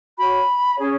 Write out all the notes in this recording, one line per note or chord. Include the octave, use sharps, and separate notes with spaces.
F#4 C#5 B5
C#4 G#4 C#5